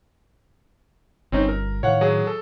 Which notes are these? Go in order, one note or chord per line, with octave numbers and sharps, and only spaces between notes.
G1 C4 C#4 D#4
A#4
A2 D#3 C#5 F5 F#5
F#3 G#4
A4